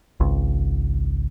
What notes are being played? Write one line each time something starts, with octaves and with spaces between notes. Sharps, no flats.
G#1 C#2